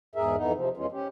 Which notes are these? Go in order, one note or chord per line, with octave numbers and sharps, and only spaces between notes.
E2 G#2 G#4 A#4 E5
F2 E3 B3 D#4
C3 F3
F2 E3 G#3 C#4 F4
C#4 G4